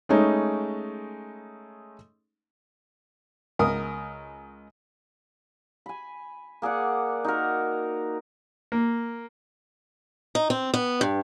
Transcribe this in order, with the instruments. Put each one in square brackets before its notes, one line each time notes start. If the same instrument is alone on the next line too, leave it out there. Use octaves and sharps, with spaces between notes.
[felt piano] G#3 A3 C#4 D#4
[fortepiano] C#2 A#4 D#6
[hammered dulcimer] G#5 B5
A#3 G#4 D5 F#5
D#4 F#4 A#4
[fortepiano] A#3
[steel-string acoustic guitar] D#4
C4
B3
G2